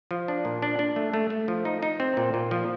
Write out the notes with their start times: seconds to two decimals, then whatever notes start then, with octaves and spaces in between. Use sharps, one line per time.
0.11 F3
0.28 D4
0.45 A#2
0.62 D4
0.79 D4
0.96 A3
1.14 A3
1.30 A3
1.48 F3
1.65 D#4
1.83 D#4
2.00 C4
2.17 A#2
2.34 A#2
2.51 F3